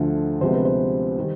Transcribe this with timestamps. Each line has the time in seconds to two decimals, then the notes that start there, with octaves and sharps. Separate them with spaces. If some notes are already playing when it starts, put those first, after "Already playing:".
Already playing: D2 D3 F3 A3
0.41 D2 C3 F3 G#3 B3 C5
0.54 B4
0.65 C5
1.19 D#3 G3